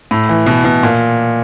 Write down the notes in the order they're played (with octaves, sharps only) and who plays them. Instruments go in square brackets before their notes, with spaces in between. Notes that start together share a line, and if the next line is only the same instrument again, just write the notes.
[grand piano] A2
E3
B2
B2
A#2